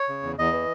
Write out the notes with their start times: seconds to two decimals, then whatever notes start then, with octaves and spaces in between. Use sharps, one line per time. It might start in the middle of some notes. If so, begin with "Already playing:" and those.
Already playing: C#5
0.09 C#3
0.23 E2
0.38 E2 D#5
0.53 E3